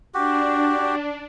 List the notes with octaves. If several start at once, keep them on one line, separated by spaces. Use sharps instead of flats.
D4 F#4 G4